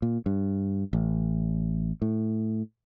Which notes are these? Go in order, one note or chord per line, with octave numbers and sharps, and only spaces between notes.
A#2
G2
A1
A2